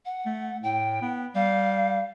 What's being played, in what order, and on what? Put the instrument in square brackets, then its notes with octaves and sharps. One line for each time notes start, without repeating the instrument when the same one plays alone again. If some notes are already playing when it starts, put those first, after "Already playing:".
[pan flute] F#5
[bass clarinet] A3
[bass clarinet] A2 [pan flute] G5
[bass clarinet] B3
[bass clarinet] G3 [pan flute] F5